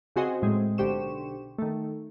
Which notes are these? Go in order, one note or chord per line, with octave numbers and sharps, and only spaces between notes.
C#3 C4 F#4 G#4 C5 D#5
A2 G#3 C4
B1 D3 G4 C5 C#6 E7
D#3 A3